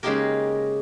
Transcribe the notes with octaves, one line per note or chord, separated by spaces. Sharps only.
C#3 G#3 A#3 D#4 G4 A#4